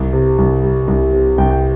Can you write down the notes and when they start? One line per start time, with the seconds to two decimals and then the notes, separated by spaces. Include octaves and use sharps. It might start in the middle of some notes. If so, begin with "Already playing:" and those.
Already playing: C2
0.13 C3
0.38 C2
0.63 G3
0.88 C2
1.13 C3
1.38 C2 G5
1.51 G5